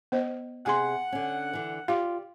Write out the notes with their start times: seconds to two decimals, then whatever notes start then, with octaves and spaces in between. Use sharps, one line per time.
0.12 B3 C5 D#5
0.66 C3 G#4 F#5 G#5 C6
1.12 D3 C#4
1.53 D3 E3
1.88 F4 G4 D5 F5